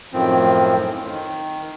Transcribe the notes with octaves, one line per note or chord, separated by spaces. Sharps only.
F#2 A2 D#3 F3 C4
D#3